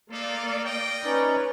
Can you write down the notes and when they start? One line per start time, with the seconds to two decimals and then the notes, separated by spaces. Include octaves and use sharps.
0.11 A#3 D#4 F4 A4 D5 F5
0.63 D#5 G5
1.04 C#4 D#4 B4 C#5 D5